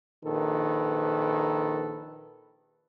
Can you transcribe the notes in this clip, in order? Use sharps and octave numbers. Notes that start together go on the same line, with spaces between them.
A#1 D#3 A4 B4